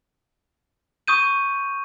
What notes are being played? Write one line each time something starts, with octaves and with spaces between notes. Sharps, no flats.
C#6 D#6 G6 D#7